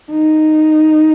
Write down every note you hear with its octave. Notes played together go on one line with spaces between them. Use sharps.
D#4